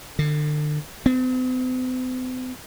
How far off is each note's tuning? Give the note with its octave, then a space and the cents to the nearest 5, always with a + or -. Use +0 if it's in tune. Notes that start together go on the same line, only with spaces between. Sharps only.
D3 +35
C4 -45